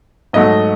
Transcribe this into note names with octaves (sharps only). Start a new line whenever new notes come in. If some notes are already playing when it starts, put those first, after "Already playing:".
G#2 F#3 A3 D#5